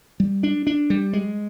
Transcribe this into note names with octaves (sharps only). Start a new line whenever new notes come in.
G3
D4
D4
G3
G#3